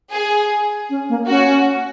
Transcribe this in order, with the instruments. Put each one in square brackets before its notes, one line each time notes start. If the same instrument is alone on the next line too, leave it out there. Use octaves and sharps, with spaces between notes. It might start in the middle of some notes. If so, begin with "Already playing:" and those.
[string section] G#4
[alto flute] C#4
A#3
[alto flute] C#4 [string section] F#4